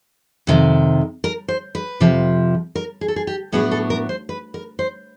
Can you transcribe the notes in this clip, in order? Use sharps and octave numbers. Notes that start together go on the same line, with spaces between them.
F2 C3 D#3
A#4
C5
B4
F2 C3 F3
A#4
G#4
A4
G#4
G4
A2 F#3 B3 D4 G#4
A4
A#4
C5
B4
A#4
C5